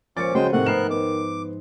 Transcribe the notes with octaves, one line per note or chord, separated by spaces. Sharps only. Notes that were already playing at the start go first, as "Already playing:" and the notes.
C#2 A#2 F3 C#4 D6 A6 C#7
C#3 F#3 G#3 C5 G5 C7 D#7
A2 C3 D#3 F#4 F#5
G#2 A3 B3 A#4 F#6 C7 E7
B3 D6